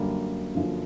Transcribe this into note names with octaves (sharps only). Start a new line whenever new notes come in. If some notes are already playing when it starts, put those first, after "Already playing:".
Already playing: F#2 D3 G3 A#3
F#2 D3 F3 A#3